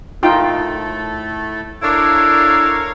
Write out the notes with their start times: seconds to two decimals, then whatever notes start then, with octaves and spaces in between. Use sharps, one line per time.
0.23 A2 A3 D#4 F4 A4 G5
1.83 D4 E4 A4 A#4 C#5 F5